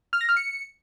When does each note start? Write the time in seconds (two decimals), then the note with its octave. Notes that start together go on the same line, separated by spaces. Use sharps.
0.13 F6
0.21 A#6
0.29 F6
0.37 C#7